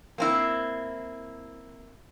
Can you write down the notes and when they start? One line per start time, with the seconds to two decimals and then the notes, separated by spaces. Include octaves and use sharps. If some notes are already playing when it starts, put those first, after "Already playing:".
0.18 A#3 C4 E4